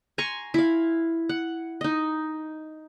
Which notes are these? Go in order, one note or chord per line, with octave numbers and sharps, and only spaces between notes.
G#5 A#5 C6 C#6
E4 F5
F#5
D#4 D#5